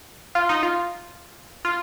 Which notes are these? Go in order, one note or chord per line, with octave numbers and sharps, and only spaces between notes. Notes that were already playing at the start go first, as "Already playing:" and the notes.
F4
D#4
F4
F4